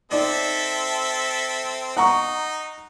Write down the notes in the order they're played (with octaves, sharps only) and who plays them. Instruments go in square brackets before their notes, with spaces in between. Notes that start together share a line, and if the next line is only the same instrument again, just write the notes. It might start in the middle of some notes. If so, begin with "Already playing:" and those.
[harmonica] C4 A4 E5 [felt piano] D#4 D5
[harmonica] D#4 [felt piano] F#5 A#5 C#6